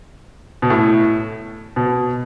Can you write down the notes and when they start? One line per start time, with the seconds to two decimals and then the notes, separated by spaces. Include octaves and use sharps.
0.62 B2
0.70 A2
1.76 B2